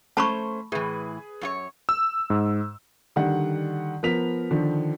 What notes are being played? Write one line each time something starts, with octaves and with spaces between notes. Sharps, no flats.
A3 C#4 C5 A5 B5 C#6
A2 E3 G#4 B4 D#7
F#2 F4 C#5
E6
G#2
D3 D#3 G3 F#5
F3 B3 A#4 B6 F7
D3 D#3 F3